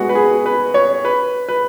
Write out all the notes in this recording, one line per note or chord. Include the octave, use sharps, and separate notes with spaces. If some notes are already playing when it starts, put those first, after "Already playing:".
Already playing: G#3 B3 F#4
B4
G#4
B4
C#5
B4
B4